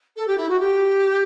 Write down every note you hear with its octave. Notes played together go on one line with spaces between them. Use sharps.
A4
G4
E4
F#4
G4